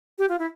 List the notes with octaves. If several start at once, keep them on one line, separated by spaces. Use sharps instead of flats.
G4
F4
E4